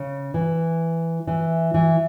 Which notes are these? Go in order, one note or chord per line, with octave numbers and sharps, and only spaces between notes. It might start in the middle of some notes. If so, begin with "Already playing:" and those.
Already playing: C#3
E3
E3
E3